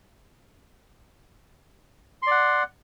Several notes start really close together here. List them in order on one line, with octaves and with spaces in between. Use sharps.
C6 D5 F#5